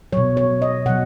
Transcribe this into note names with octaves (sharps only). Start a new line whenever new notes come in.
B2 F#3 C#5
C#5
D#5
B2 F#3 F#5